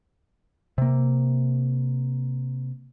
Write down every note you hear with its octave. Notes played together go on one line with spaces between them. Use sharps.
C3 A#3